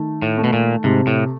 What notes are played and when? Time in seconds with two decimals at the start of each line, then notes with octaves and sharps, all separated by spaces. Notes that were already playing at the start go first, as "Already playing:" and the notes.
Already playing: D#3 A3
0.22 A2
0.38 A3
0.44 B2
0.53 A#2
0.84 G#2 C3
1.07 A2